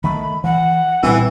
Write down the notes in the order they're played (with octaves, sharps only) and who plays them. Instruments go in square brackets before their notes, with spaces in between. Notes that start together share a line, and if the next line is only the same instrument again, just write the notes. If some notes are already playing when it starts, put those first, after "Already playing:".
[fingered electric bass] D#3 A3 [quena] B5
[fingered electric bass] E3 [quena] F#5
[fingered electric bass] A#2 G3 C4 [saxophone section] E3